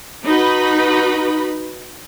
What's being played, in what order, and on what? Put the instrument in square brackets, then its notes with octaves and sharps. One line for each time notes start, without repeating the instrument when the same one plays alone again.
[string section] D#4 F#4 B4 B5